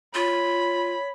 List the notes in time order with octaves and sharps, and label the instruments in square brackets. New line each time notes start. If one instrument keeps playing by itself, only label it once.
[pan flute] F4 [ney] C#5 [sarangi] B5